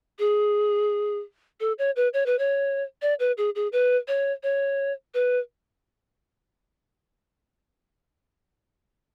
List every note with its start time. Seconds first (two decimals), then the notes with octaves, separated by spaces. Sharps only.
0.19 G#4
1.60 A4
1.78 C#5
1.96 B4
2.13 C#5
2.26 B4
2.39 C#5
3.02 D5
3.20 B4
3.38 G#4
3.55 G#4
3.72 B4
4.08 C#5
4.43 C#5
5.14 B4